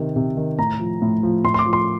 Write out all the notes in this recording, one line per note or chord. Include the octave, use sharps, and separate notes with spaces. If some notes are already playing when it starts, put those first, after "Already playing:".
Already playing: C3 D#3
C3
D#3
A2 A#5
F3
A2
F3
A2 C6
C6
D6
F3
C6